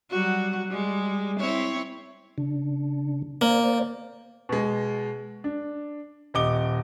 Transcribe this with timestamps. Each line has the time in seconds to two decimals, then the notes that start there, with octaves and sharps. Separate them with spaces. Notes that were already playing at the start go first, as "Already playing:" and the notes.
0.10 F#3 G3 F#4
0.67 G3 G#3
1.40 C4 E4 C#5
2.38 C#3 D4
3.41 A#3 C5 D5
4.49 B2 G#3
5.44 D4
6.34 D#1 D#5 D6 G7